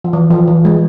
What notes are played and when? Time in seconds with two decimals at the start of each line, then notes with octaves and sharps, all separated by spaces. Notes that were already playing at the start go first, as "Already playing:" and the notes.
0.04 F3
0.13 E3
0.31 F3
0.48 E3
0.65 G#3